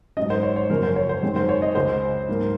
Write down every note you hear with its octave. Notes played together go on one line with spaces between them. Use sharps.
G#2 F#3 C#4 D#5
C5
C#5
C#5
F#2 C#3 F3 A#3 C#4 A#4
C5
C#5
C5
F#2 D#3 G#3 C4
C5
C#5
D#5
C#2 C#3 G#3 C5
G#2 F#3 A#3